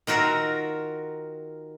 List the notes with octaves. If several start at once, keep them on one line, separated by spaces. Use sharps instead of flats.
D#3 F4 F#4 A#4 E5 A#5